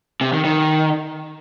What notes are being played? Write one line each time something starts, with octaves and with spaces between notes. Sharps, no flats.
C3
D#3
D#3